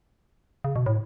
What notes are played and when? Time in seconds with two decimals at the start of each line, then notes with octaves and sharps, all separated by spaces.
0.64 C#3
0.76 B2
0.86 A2